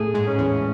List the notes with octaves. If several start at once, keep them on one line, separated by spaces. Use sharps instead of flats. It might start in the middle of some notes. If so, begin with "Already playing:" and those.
Already playing: A2 A3 G#4
G#2 G#3
C#4
E2 E3